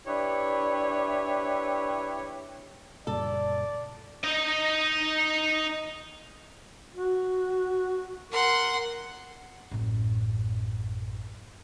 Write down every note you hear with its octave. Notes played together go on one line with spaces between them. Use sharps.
D4 E4 G4 B4 C#5
F#1 A#2 G3 A4 D5
D#4 D#5
F#4
A#4 F#5 C6
A1 F#2